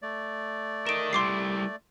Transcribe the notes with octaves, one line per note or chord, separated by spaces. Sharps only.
A3 D5
A#4 D#5 D7 E7
G3 E4 C6 D6 C7